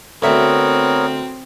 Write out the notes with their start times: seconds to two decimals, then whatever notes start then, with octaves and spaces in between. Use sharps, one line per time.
0.22 D2 B3 C4 A#4 C#5 E5